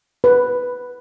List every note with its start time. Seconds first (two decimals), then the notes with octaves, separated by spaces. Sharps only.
0.24 B4